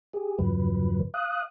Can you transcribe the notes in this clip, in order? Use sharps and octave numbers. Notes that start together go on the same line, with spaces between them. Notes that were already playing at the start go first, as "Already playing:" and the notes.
G4 G#4
E2 G2 C#3 F3 F#3 B4
F5 D#6 F#6